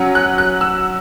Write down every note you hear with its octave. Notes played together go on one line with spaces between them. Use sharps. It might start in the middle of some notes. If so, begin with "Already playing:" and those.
Already playing: F#3 C#4
F#6
F#6
E6